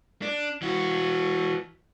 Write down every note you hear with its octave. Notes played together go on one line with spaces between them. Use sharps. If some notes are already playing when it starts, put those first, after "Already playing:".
D4
E3 F#4